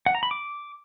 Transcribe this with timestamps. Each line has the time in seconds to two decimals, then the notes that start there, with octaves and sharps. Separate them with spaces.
0.06 F#5
0.15 A#5
0.23 B5
0.31 D6